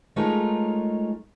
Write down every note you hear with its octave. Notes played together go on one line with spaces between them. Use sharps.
G#3 A3 D#4 F4 A#4 C#5